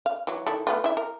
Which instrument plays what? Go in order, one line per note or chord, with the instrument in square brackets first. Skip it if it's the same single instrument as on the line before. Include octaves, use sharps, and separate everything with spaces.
[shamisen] F5
E3 F#3
D#3 E4 A4
A3 B3 F4
E4 E5
A#4